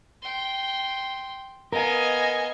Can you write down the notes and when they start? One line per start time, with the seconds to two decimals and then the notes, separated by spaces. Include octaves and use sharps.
0.22 G5 C6
1.73 B3 A#4 D#5 F5 G#5